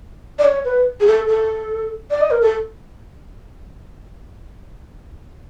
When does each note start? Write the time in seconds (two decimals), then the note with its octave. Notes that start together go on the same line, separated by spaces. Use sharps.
0.39 D5
0.44 C#5
0.65 B4
1.00 G#4
1.06 A4
1.27 A4
2.11 D5
2.21 D#5
2.31 A#4
2.42 A4